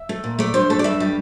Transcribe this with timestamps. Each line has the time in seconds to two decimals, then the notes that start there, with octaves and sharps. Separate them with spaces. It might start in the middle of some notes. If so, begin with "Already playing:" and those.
Already playing: E5
0.09 A3
0.24 A#2
0.39 A3 D5
0.54 G2 C5
0.70 A3 A4
0.79 D5
0.84 G2 E5
1.00 G3